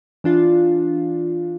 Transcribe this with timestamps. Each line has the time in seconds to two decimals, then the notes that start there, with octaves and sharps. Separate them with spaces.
0.24 E3 D4 F4